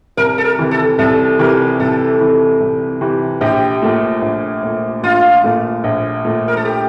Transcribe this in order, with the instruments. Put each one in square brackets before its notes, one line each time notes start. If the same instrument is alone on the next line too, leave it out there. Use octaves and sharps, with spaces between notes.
[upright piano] C2 [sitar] A#4
[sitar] A4
A#4
[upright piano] C3 E3
[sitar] A4
[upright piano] C2 [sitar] A4
[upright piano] C3 E3 [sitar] A#4
[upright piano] C2 [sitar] A4
[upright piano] C3 E3
C2
C3 E3
[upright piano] A#1 [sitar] G4
[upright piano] A#2 A3
A#1
A#2 A3
[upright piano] A#1 [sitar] F4
[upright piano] A#2 A3
A#1
A#2 A3
[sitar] A#4
A4
G4